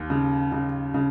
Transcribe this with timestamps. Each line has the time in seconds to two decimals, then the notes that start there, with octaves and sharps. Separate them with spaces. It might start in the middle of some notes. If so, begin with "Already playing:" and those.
Already playing: D#2
0.10 C#3
0.52 C#3
0.94 C#3